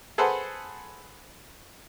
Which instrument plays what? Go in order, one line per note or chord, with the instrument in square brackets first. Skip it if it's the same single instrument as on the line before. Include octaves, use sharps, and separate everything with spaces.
[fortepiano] G#4 A4 B4 C5 F#5